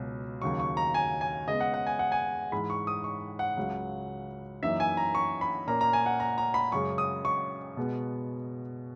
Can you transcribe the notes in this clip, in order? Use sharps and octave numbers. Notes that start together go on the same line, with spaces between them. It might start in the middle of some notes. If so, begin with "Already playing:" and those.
Already playing: C#2 B2 F#3
D#2 C#3 F#3 C#6
C#6
A#5
G#5
G#5
C#3 G#3 B3 D#5
F#5
F#5
G#5
F#5
G#5
G#2 E3 G#3 B5
C#6
D#6
C#6
F#5
C#2 C#3 F#3
F#2 E3 A#3 D#4 E5
G#5
A#5
C#6
B5
A#2 A#3 C#4 A#5
A#5
G#5
F#5
A#5
A#5
B5
F#2 C#3 G#3 C#6
D#6
C#6
B2 G#3 B3